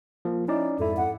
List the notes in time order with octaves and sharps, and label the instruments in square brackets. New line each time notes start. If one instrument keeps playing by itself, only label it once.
[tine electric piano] F3 A#3
[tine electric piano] C#4 D#4 D5 [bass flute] E4
[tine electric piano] F2 G#2 E4 [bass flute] A4
[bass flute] F#5